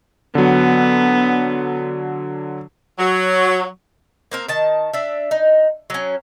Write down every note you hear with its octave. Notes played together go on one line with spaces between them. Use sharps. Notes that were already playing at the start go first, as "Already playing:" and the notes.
D3 F#3 B3
F#3
A#3 C4 A#4
D#3 A5
D4 E5
D#4
F#3 C#4